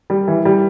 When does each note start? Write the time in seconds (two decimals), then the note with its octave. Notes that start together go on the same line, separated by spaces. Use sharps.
0.10 G3
0.28 E3
0.45 G3